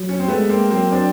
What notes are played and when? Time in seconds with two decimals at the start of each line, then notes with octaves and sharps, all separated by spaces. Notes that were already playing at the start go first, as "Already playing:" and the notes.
Already playing: F#3
0.09 C#4
0.19 C4
0.28 G#3 A3 B3
0.49 A#3 C4
0.70 F#3 A#3 C4
0.92 C4 D4